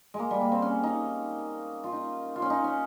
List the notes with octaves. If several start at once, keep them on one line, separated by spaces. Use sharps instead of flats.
G#3
A#3
G3
A#3
C4
C#4
D#4
F4
D#4
F4
C#4
D#4
C#4